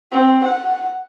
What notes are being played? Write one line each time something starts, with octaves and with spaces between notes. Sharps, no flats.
C4
F#5